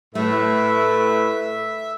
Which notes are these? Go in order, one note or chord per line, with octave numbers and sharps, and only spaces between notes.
A2 A3 B4 E5